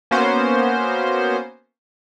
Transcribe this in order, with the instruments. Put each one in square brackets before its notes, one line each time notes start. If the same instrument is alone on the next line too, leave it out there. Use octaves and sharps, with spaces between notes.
[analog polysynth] A#3 B3 C#4 F#4 C5